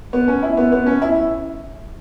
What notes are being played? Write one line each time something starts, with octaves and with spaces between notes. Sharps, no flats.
B3
C#4
E4
B3
B3
C#4
E4